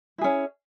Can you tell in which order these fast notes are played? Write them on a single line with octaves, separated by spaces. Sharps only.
E4 G#4 C#4